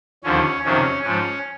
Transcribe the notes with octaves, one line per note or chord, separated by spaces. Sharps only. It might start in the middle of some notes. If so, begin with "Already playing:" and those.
D#2 D3 F3 C#4
F2 C3 D#3 F#3 C#4
G#2 F3 C#4